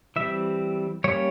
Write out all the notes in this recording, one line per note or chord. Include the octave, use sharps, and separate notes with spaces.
E3 G3 C4 E5
G3 A#3 C#4 C#5